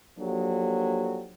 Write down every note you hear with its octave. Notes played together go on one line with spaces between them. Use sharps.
F3 F#3 A#3 D4 G4 A4